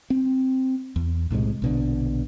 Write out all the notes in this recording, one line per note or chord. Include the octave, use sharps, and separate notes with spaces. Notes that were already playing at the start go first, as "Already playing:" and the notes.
C4
E2
B1 A2 C3 G#3
A#1 B2 D3